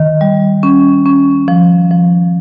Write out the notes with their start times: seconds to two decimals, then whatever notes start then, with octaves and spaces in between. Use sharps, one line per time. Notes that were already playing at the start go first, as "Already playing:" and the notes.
Already playing: D#3
0.21 G3
0.63 C#4
1.06 C#4
1.48 F3
1.91 F3